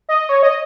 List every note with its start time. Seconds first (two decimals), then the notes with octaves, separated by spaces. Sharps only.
0.09 D#5
0.29 C#5
0.43 D#5